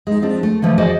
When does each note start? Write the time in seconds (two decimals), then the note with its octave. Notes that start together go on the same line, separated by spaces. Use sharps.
0.07 G#3 D#4
0.22 F3 C4 D4
0.43 A3
0.62 D3 E3 F3 A3
0.78 F#4 G#4 C5 D5 D#5 G#5